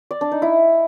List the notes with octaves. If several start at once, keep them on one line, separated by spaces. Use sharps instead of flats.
D5
D4
D#4
E4